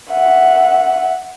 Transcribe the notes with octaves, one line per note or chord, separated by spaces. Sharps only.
E5 F#5